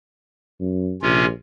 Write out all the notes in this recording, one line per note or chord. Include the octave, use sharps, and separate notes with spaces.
F#2
A#1 C3 C#4 F4